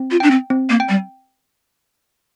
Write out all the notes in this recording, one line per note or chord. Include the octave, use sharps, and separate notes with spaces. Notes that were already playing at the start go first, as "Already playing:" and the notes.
Already playing: C4
F4
D4 G5
C4
C4
A#3
G5
G3